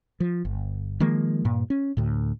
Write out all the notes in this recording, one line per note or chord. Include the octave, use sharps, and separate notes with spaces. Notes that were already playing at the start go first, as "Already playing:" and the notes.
F3
G1
D#3 F3 G#3 A#3
G2 A#2
C#4
D2 A2